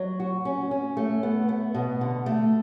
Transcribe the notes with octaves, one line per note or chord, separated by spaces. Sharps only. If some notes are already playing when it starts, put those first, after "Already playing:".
Already playing: F#3
F#4
C#4
C#4
A3
B3
B3
B2
D3
A3